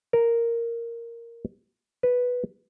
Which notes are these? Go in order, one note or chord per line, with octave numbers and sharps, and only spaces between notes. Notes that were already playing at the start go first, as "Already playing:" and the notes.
A#4
B4